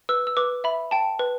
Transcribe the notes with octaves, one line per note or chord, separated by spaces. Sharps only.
B4 E6
E6
B4 D6
E5 B5
G5 A5
B4